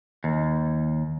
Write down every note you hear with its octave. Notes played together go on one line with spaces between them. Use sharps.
D#2